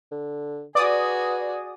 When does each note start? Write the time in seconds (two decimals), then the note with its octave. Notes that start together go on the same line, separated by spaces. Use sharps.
0.12 D3
0.75 F#4 G#4 B4 D5 D#6